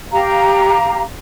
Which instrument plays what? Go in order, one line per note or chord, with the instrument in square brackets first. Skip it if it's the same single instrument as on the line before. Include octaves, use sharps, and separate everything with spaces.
[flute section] G4 F5 A#5